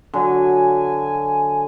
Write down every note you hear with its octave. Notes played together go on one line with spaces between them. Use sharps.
D3 F#3 G#5